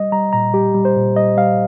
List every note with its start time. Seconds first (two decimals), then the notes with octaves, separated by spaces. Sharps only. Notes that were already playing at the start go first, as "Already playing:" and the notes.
Already playing: G3 D#5
0.12 G3 A#5
0.33 A#2 A#5
0.53 G3 G4
0.75 G3
0.85 C5
0.96 A#2
1.16 G3 D#5
1.37 G3 F5